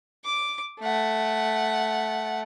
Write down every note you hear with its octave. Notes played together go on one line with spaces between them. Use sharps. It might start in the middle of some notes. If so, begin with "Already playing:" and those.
D6
A3 F#5